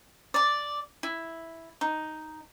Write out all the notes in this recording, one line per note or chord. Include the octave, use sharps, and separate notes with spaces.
D5 D6
E4
D#4